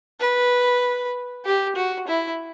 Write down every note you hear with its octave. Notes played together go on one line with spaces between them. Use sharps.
B4
G4
F#4
E4